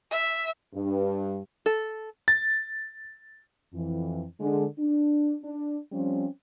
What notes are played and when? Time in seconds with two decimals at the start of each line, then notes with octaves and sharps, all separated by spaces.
0.11 E5
0.74 G2
1.66 A4
2.28 A6
3.74 F2 E3
4.40 D3 G#3
4.79 D4
5.43 D4
5.92 F3 G3 C4 C#4